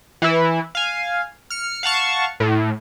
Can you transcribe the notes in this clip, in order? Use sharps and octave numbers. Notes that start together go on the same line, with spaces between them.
E3 E4
F5 G#5
F6 C#7
F5 F#5 A5 C#6
A2